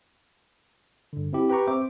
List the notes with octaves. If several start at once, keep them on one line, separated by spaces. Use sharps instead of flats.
G2 D3
C4 E4 G4
G4 B4 G5 A#5 C#6
C4 C5 E5 D6